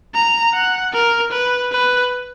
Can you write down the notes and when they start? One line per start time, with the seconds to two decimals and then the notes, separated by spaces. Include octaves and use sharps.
0.14 A#5
0.54 F#5
0.93 A#4
1.32 B4
1.72 B4